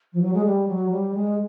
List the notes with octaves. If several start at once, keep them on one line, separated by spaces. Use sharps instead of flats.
F3
F#3
G#3
G3
F#3
G3
G#3